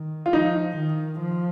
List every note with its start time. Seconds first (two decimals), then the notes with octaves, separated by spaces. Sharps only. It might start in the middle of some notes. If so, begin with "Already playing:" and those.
Already playing: D#3
0.26 F4
0.33 F3 D#4
0.77 D#3
1.20 F3